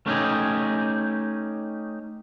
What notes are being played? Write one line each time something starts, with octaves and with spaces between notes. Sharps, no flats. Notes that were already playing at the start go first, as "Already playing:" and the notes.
A3 C#4 D#4 G4 G#4